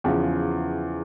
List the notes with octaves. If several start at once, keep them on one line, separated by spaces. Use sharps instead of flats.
E2 C#3 F3